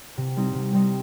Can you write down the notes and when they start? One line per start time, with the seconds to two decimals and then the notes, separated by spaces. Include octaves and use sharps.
0.17 C3
0.36 G3 C4 D#4
0.55 C3
0.73 G3 C4 D#4